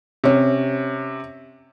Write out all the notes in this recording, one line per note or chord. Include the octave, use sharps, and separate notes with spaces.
C3 C#4